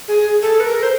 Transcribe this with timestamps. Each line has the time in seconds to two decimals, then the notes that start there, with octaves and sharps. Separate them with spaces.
0.08 G#4
0.42 A4
0.60 B4
0.64 A#4
0.83 C5